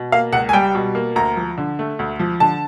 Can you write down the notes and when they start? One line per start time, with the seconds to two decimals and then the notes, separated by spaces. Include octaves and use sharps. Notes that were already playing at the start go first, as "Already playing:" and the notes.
Already playing: B2
0.12 A#3 F5
0.33 C#2 F#5
0.49 G#5
0.53 G3 G5
0.75 B2
0.95 A#3
1.16 D2 A#5
1.37 F3
1.58 D3
1.79 A3
1.99 D2
2.20 F3
2.40 D3 A5